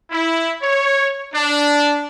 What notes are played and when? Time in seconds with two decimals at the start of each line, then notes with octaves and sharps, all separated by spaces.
0.11 E4
0.62 C#5
1.34 D4